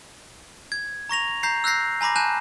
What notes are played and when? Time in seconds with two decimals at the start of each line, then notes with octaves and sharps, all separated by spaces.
0.72 G#6
1.09 A#5 C#6 A#6 F7
1.43 A#5 G6 C7
1.64 E6 F#6 G6 A#6 C7
2.01 G#5 A#5 B5 D6 A#6
2.16 G#5 A5 F#6 G6 E7